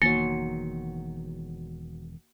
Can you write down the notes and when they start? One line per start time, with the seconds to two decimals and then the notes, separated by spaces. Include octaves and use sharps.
0.02 E1 E2 D#3 F#3 A#3 C6 A6 C#7